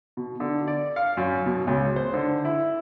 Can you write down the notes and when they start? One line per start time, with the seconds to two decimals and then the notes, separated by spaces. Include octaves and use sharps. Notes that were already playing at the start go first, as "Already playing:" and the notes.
0.17 B2
0.40 D3
0.67 D5
0.96 F5
1.17 F#2
1.46 B2
1.67 C#2
1.96 C5
2.14 D3
2.45 E4